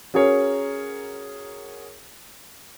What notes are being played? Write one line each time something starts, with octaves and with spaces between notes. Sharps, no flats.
C#4 F#4 G#4 A#4 C#5